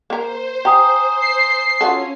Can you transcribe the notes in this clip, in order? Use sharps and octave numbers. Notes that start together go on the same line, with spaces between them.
A#3 A#4 C5
G4 G#5 A#5 D#6
C7
C#4 F4 F#4 A4